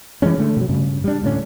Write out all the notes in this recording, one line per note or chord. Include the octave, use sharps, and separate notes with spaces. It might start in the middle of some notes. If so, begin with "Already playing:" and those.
E3 F#3 G#3 C#4
D3 A3
B2 F#3
G2 C#3
G3 D4
D1 A2 D3 C#4